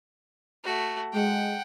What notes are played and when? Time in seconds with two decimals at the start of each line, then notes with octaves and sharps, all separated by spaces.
0.64 A3 F#4
1.13 G#3 F#5 G5